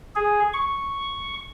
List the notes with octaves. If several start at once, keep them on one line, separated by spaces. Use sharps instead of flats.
G#4
C#6